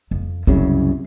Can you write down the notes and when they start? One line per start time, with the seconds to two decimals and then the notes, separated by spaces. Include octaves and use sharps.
0.11 F2
0.47 C2 F#2 C#3 C4